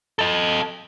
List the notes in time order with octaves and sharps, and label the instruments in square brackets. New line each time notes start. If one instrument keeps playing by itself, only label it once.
[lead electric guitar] A4 D#5